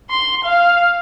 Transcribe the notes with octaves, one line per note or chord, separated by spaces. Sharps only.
C6
F5